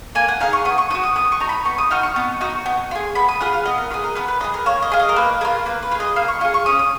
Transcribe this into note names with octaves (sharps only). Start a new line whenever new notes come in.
A#3 G#5
F#5
D#4 G#4 F5
C#6
B3 D#6
C#6
D#4 D#6
F#4
D#6
B3 D#6
C#6
D#4 F#4 A#5
B5
B3 C#6
D#6
D#4 F#4 F6
C#6
B3
D#4 F#4
B3
F4
G#4
B3 B5
D#6
F4 G#4 F#5
F5
B3 D#5
A#4
F4 G#4 B4
A#4
B3 B4
B4
F4 G#4 D#5
A#4
A#3 C#5
D#5
F4 G#4
D#5
A#4
A#3 B4
F4 G#4 A#4
A#3 B4
B4
F4
G#4
D#5
A#3 F5
C#6
F4 G#4 C#6
C#6
C#4 D#6
D#6